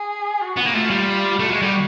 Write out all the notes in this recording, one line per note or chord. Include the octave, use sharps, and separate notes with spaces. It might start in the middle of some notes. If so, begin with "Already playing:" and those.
Already playing: G#4
F#4
B3
A#3
A3 F4
G3
A3 F#4
G#3
G3